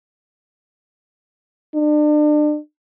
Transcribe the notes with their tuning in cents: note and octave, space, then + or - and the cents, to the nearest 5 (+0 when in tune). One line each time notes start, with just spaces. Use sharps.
D4 +35